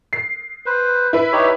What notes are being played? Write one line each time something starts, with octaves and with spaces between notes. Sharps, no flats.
C7
B4 C5
E4 B4
D#4 G4 C#5